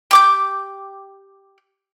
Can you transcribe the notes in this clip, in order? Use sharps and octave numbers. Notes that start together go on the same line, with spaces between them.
G4 D6 G6